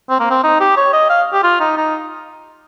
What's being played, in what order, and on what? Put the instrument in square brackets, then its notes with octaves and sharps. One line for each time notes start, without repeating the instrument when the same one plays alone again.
[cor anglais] C4
A#3
C4
D#4
G4
C#5
D#5
F5
G4
F4
D#4
D#4